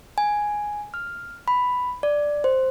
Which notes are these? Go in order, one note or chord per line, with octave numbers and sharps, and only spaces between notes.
G#5
F6
B5
D5
C5